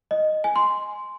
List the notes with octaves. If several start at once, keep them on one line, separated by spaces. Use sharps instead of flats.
D#5
G#5
C6